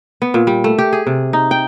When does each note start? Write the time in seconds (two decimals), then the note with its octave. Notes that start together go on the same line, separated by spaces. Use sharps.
0.22 B3
0.34 A#2
0.47 G3
0.64 A3
0.78 G4
0.93 G#4
1.07 C3
1.33 D#4
1.51 G5